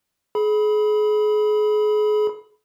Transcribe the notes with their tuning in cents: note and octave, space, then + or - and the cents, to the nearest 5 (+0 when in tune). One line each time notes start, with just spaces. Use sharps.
G#4 +35 B5 -5